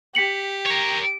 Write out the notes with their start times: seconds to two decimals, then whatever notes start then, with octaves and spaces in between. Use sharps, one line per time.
0.15 G4 B6 C#7 F#7
0.66 A#4 C#5